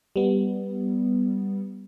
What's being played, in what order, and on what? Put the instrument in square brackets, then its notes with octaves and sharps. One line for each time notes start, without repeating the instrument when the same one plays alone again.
[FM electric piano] G3 B3